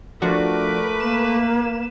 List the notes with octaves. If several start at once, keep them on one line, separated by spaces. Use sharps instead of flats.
F3 A3 D4 F#4 A#4 B4 D6
A#3 E7